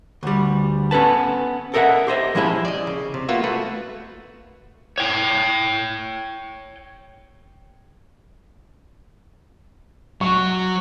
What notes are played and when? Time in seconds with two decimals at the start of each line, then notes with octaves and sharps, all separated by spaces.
0.23 D2 G3
0.91 B3 C#4 A4 B4 A5
1.74 A4 A#4 D#5 E5 F#5
2.07 G4 C5 D#5 E5
2.35 F3 G#3 C#4 E4 G4
2.65 D5 D#5
2.87 C#3
3.14 C3
3.29 A#3 B3 F4 F#4 E5
3.44 A3 F#4 B4
4.98 C#5 G5
10.21 F#3 C#6